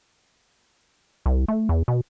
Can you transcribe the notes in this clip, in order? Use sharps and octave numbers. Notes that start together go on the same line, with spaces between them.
C2
A3
E2
B2